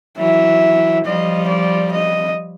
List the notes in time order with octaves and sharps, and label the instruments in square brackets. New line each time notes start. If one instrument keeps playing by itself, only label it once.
[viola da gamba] E3 F#3 [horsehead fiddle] E5
[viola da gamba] F3 G3 [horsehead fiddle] D#5
[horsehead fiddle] D5
D#5